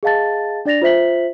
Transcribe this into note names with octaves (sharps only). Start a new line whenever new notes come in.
G#4 D#5 F5 A5 A6
D4 D5 A6 A#6 F7
F4 C5 E5 B6 F#7